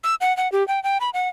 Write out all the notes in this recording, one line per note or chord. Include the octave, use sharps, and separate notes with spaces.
E6
F#5
F#5
G4
G5
G5
B5
F#5